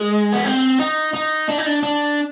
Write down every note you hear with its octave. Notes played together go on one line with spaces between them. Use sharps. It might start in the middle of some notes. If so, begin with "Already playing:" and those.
Already playing: G#3
B3
C4
D#4
D#4
D4
D#4
D4
D4